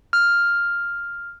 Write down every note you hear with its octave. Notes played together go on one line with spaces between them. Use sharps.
F6